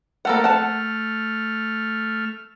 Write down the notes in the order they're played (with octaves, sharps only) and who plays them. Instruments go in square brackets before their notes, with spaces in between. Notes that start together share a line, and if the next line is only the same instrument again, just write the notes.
[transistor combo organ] A3 F6 [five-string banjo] A#3 A4 F#5
[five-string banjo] F#5 A5